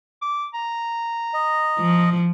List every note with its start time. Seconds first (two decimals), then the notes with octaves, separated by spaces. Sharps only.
0.22 D6
0.54 A#5
1.33 D#5
1.80 F3